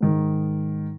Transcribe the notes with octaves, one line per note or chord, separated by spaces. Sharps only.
G#2 D#3